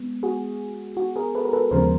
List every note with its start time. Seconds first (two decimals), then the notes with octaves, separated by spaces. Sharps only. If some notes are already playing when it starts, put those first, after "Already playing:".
Already playing: G#3 B3
0.23 F#4 G#4
0.97 F#4
1.16 G#4 A#4
1.35 A4 B4
1.45 A#4
1.53 A4 B4
1.71 D#2 C#3 F3 G#3 B3 A#4 C5